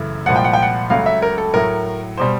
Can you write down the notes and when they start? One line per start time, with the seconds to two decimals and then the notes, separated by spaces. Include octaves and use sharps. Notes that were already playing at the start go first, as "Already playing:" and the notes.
Already playing: F#2 C#3 E3 A3
0.26 C2 A#2 F3 G#3 F#5
0.36 G5
0.44 F#5
0.53 G5
0.62 F#5
0.90 C#2 C#3 F#3 A3 F5
1.06 E5
1.22 A#4
1.38 A4
1.54 A2 F#3 A3 A#4
2.17 B2 G3 C5